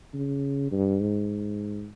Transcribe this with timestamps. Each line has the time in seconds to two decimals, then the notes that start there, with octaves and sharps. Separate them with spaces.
0.14 C#3
0.72 G2
1.01 G#2